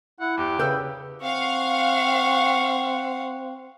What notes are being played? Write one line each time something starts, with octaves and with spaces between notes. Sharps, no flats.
E4 F#5
E2 G4
C#3 B4 G5 E6 G6
C4 F5 F#5 C#6